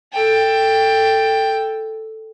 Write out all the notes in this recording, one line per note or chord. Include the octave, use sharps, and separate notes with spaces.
A4 G5